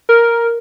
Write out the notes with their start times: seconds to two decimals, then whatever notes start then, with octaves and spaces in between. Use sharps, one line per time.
0.09 A#4